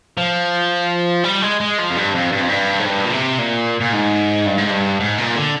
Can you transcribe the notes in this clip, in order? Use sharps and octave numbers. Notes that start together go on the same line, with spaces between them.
F3
G3
G#3
G#3
F3
F2
G2
F2
G2
F2
G2
G#2
G2
A#2
C3
A#2
A#2
G#2
G2
G#2
G2
G#2
A#2
D3